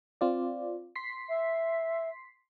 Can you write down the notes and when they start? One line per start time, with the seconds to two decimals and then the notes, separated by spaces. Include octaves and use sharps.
0.21 C4 F4 D5
0.96 C6 B6 C7
1.29 E5